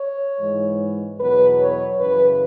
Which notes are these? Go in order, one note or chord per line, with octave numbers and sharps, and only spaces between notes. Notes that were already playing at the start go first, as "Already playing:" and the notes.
Already playing: C#5
G#2 E3 G#3
E2 B2 F#3 B4
C#5
F#2 C#3 E3 B4